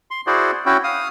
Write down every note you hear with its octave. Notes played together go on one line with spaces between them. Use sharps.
C6
E4 F#4 G#4 C5 D5
C#4 E4 F#4 G5
F5 D#6